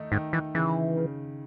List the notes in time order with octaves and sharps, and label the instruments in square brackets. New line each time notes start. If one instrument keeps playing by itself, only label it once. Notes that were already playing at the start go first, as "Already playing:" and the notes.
Already playing: [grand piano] D#3 A3 D#4
[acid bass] G#2 [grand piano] D#3
[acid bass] E3
[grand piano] C#3 [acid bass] E3
[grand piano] C#3